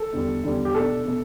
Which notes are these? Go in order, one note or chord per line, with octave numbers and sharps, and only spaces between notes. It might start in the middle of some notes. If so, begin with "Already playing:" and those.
Already playing: A4
E2 D3 G3
E2 D3 G3
G4
B2 A3 D4 A4
B2 A3